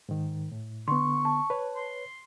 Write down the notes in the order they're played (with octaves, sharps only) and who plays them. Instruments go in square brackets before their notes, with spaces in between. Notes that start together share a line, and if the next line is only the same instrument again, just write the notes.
[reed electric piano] G#2 D#3
A2
[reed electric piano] D3 B3 [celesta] C6 [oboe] C#6
[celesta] A5
[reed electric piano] B4 C#5
[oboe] C6